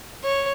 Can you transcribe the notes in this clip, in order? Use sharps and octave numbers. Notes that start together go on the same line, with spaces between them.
C#5